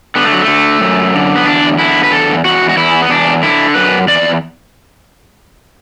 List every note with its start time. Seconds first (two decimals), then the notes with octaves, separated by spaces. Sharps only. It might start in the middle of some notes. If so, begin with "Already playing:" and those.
0.16 D3 B3
0.24 A3
0.32 F#3
0.41 A3
0.47 D3
0.81 F#2
1.14 D3
1.36 B3
1.46 E2 D4
1.78 D3 E4
2.04 B4
2.11 E2 A4
2.45 E2 F#4
2.69 F#4
2.77 E2 E4
3.02 B3
3.10 E2 D4
3.43 D3 E4
3.75 F#2 B4
4.08 E2 D5